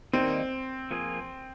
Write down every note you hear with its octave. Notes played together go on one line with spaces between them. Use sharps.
D#3 G3 A#3 C4 D#4
F3 A#3 F4 G#4